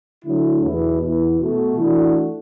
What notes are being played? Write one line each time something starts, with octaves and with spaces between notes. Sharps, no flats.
D3 F#3 A3 E4
E2 B2 B3 E4
E2 E3 B3
B2 A3 F#4
E3 A3 D4 F#4